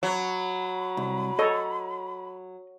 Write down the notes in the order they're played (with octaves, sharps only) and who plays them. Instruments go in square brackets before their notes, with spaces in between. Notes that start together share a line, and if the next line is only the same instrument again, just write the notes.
[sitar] F#3 [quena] B5
[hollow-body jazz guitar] C2
[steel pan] A4 C#5 [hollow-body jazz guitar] D#5